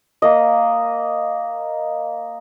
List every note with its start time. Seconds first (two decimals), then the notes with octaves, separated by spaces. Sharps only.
0.22 A#3 D#5